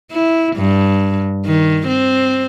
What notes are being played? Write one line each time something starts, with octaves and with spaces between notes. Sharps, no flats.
E4
G2
D#3
C4